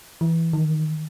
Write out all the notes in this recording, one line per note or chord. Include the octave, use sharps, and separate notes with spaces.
E3
D#3